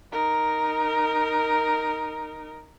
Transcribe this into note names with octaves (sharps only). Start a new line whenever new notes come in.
D#4 A#4